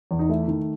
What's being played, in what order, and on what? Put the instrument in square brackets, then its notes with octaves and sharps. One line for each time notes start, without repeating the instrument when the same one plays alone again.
[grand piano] E2
D#4
A3 E4
D#3